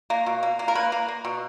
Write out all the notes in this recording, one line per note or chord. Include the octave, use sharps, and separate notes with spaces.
A#3
B2
A#3
A#3
A#4
A#3 B4
A#3
A#3
B2